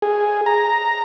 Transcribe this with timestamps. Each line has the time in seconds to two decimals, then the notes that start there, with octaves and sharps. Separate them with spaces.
0.02 G#4
0.46 A#5